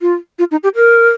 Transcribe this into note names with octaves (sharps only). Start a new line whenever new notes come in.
F4
F4
D#4
G4
A#4